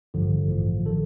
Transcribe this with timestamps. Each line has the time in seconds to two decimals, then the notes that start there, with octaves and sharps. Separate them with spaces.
0.14 A1 G2 D3 F3
0.50 A1 A2 F3
0.86 D#3 A4